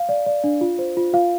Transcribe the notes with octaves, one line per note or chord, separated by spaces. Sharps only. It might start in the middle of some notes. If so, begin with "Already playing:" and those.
Already playing: F5
D5
D5
D4
F4
C5
F4
F4 F5